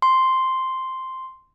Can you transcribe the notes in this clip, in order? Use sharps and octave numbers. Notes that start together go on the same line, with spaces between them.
C6